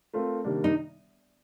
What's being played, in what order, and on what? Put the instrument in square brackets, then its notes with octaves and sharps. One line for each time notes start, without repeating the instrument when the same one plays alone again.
[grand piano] A3 C4 F4 A#4
C3 D#3 G3 A#3 D4
[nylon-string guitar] D#4